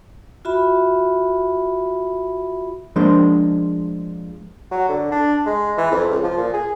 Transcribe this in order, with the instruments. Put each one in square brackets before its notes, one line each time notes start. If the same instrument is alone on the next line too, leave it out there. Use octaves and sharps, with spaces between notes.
[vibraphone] F4 F#4 E5 B5
[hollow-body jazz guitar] F3 G#3 A#3 D4 C5
[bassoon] F#3
D3
D4
G#3
E3
F2
C#2
F3
A#2
G#4